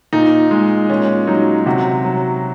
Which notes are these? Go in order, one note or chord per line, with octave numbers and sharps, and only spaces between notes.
A#2 D#4
G#3
A#2 C#4
F#3 D#4
C3 F#4
F#3